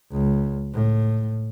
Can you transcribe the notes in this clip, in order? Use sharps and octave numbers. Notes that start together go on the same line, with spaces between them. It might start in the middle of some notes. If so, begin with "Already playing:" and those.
C#2
A2